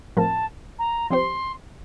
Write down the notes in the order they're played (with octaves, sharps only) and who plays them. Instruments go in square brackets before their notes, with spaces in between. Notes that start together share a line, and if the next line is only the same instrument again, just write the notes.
[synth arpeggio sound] A2 F3 C4 F4 A#4 [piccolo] A5
[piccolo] A#5
[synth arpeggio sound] F3 C4 G4 C5 [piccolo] C6